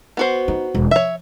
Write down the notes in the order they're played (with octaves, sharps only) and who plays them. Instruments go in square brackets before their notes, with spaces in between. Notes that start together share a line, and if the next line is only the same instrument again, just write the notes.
[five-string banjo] B3 F#4 C5
[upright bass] D#4
E1
[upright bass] F3 [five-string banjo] C#5 E5